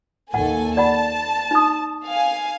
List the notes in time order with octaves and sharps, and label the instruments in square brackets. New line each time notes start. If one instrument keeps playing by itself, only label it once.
[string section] D#2 A4 G#5 [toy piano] F#5
[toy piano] D5 F#5 B5 [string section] A5
[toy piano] D#4 D#6
[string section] F5 G#5